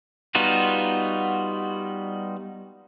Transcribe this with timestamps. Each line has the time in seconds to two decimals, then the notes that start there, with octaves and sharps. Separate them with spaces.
0.35 G3 B3 D#4 F4 F#4